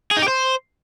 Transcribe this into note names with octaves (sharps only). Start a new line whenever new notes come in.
G#4
D#4
G4
C5